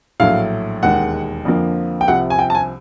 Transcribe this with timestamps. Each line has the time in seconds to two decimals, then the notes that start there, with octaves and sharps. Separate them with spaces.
0.20 A#1 A2 F#3 A3 F5
0.83 E1 D#2 D#3 G#3 F#5
1.45 F2 D3 F3 A#3
2.01 G5
2.08 C2 C3 F3 F#5
2.30 G#5
2.39 G5
2.50 A5
2.55 G#5